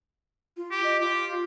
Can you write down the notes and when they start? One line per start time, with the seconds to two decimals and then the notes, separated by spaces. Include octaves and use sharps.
0.57 F4
0.71 G4
0.84 D#5
1.00 F4 G4